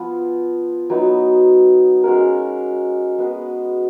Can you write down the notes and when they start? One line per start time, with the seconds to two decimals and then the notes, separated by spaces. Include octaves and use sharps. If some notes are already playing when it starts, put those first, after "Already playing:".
Already playing: F3 B3 F4
0.90 F#3 B3 D#4
2.04 G#3 C#4 F#4 A#4
3.18 G#3 B3 F#4 B4